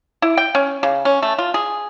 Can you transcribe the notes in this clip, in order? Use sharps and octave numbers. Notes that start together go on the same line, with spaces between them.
E4
G5
C#4
C#3
C#4
A3
F4
G#4